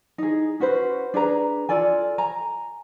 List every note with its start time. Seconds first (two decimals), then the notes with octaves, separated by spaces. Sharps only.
0.18 D#4 G#4
0.60 C#4 F#4 B4 C5
1.14 D4 G#4 B4 A#5
1.69 F4 A4 D5 G#5
2.18 G#5 A#5